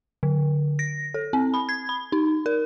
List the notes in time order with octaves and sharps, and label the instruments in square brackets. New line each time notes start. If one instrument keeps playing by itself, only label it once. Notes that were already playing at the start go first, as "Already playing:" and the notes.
[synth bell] D3
A#6
A4
C4
B5
G#6
B5
D#4
A#4